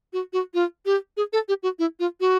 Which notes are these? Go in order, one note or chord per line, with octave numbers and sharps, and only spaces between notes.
F#4
F#4
F4
G4
G#4
A4
G4
F#4
E4
F4
F#4